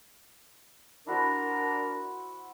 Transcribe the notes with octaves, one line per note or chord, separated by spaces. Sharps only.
D4 E4 F#4 A#4 C5